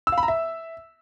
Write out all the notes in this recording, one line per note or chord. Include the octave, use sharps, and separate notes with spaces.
E6
F5
B5
A#5
E5